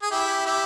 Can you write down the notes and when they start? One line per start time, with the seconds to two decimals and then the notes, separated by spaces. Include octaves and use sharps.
0.03 G#4
0.11 E4 G4
0.46 E4 G4